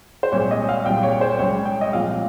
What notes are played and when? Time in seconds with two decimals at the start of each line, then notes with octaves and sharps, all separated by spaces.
0.23 C5
0.32 C2 A#2 G#3 C#5
0.51 D#5
0.69 F5
0.85 C2 A#2 G3 G5
1.03 C#5
1.21 C5
1.39 C#2 C#3 G3 C#5
1.65 G5
1.81 D#5
1.93 C2 A#2 F3 G#3 F5